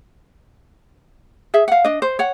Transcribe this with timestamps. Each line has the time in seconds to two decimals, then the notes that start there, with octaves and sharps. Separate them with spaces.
1.54 G#4 E5
1.68 F5 F#5
1.85 D4 D#5
2.02 C5
2.19 C#5 F#5